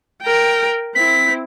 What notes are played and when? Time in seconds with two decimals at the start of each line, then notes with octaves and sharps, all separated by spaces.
0.22 A#4 G5
0.95 C4 E4 B6